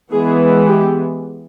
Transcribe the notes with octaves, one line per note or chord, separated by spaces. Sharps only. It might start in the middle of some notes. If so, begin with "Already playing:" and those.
E3 G#3 B3 G#4
G4